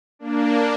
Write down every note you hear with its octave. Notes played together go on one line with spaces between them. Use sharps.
A#3 D4